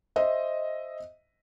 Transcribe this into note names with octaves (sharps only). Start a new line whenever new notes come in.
C5 D#5 E5